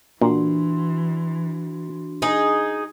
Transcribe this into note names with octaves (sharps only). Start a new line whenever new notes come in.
A#2 E3 D4 F#4 C6
D#4 G#4